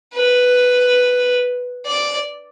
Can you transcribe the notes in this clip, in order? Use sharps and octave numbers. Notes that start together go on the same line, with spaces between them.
B4
D5